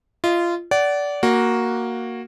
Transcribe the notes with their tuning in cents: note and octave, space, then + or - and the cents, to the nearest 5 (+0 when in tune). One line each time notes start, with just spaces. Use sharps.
F4 -20 D#5 +0
D5 -20 F#5 +25
A#3 +0 F#4 +0 A#5 +0